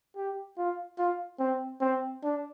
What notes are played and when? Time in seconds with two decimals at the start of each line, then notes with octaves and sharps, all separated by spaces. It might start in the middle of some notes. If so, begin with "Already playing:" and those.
0.16 G4
0.58 F4
0.98 F4
1.39 C4
1.81 C4
2.23 D4